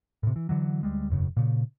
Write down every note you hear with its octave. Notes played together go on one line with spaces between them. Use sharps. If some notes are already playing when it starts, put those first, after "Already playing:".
A2 C3
E3
D3 E3 F#3
D2 G3 G#3
E1 F#2 C#3
A#2 C#3